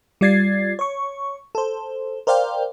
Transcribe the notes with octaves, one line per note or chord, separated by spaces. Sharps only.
G3 F4 D5 G#6 A6 C7
C#5 C#6
A4 C5
A#4 C5 D5 F5 G5